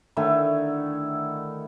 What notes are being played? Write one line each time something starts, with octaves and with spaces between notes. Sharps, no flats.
D3 D#3 A3 E4